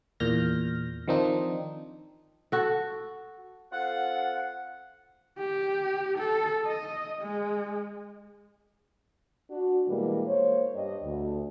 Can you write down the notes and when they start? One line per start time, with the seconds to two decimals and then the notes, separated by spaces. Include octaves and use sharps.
0.20 E2 A#2 F6 G6 A#6
1.08 D#3 F3 C4 D4 D#4
2.52 F#4 A4
3.72 C4 F4 A4 F#5
5.39 G4
6.19 A4
6.67 D#5
7.22 G#3
9.50 D4 F#4
9.88 B2 E3 G3 G#3 A#3
10.27 A#3 C5 C#5
10.75 G2 G3 D4 D#5
11.04 D2